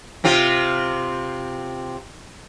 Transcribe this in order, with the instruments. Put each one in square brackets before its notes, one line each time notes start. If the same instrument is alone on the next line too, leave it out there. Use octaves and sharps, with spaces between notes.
[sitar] C3 C4 F4